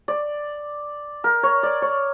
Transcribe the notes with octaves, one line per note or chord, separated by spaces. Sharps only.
D5
A#4
C#5
D5
C#5